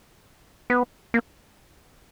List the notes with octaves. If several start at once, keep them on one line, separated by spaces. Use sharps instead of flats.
B3
A#3